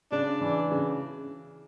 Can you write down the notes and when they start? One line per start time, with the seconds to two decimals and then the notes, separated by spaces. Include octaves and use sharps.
0.12 C#3 D4
0.41 E3
0.71 C#3